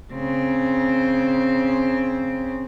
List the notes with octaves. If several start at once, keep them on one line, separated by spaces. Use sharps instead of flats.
C#3 C4